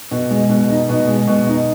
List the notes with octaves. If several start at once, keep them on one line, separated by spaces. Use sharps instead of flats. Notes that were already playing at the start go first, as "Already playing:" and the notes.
B2
G#3
B2
D#4
B2
G#3
B2
D#4